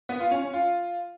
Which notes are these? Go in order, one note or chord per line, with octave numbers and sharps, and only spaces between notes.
B3
F4
C#4
C#4
F4